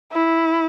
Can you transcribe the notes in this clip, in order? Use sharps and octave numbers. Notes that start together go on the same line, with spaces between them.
E4